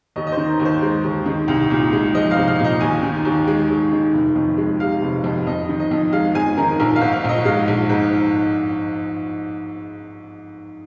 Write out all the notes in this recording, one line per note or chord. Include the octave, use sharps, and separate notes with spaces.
D#2 D#5
D#5
C5
D#3
A#4
D#2
C5
G#3
D#2
D#3
C2
A#2
G#3
F3 D#5
F5
C2
F5
A#2
D#5
D#2 G#5
D#3
D#2
G#3
D#2
D#3
F1
F2
G#3
C3 F5
F1
F2
F2 D#5
D#3
D#5
F2
G#3 F5
F2 G#5
D#3 A#4
A#1 A#4
F5
G#2
F5
A#1 D#5
G#3 F5
A#1
G#2